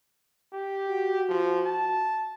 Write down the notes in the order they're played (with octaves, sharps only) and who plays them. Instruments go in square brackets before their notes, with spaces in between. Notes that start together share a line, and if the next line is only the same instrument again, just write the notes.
[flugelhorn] G4
[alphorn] F#4
[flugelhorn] F3
A5